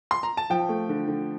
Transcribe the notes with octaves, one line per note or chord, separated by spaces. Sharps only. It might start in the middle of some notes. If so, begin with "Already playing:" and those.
C6
A#5
A5
F3 G5
A3
D3
D3